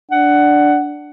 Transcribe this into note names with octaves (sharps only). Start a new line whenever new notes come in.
D4 F#5